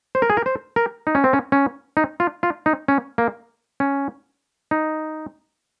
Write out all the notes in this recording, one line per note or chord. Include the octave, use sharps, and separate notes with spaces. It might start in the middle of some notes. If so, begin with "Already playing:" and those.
C5
A#4
G#4
A#4
C5
A#4
D#4
C#4
C4
C#4
C#4
D#4
F4
F4
D#4
C#4
A#3
C#4
D#4